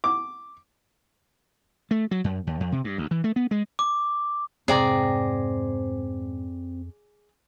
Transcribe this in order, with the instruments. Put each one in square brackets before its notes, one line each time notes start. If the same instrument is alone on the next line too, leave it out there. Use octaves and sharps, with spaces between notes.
[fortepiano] D6
[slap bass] A3
F#3
F#2
D#2
F2
C3
G2
D2
E3
A3
B3
G#3
[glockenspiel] D6
[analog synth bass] F2 [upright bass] G#2 C3 [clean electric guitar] C4 [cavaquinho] G#4 D5 A#5